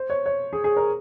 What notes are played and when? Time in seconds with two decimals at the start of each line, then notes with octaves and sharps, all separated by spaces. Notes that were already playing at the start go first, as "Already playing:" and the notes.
Already playing: C5
0.10 C#5
0.26 C#5
0.53 G#4
0.64 G#4
0.76 A#4